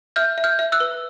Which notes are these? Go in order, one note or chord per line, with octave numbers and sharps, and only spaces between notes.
E5 F6 G6
E5
F6 G6
E5
E6 F#6
B4